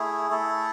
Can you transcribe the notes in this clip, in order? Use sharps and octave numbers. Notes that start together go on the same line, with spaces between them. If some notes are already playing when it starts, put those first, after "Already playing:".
Already playing: A3 E4 G#4
A3 E4 A4